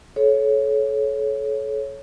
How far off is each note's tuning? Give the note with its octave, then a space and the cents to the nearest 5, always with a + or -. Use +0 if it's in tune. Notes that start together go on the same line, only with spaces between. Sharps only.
A4 -35 C#5 +0